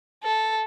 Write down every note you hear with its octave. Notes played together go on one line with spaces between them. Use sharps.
A4